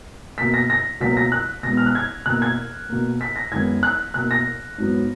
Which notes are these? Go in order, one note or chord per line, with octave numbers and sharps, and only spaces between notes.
B2 A#3 B6
A#6
A#6
C#2 B2 F#3 A#3 B6
A#6
F#6
B2 G#3 B3 A#6
F6
F#6
G#6
B2 A#3 F#6
G#6
B2 A#3
B6
A#6
F#2 D#3 G#3 B3 G#6
F#6
B2 A#3 F#6
A#6
G#2 F#3 B3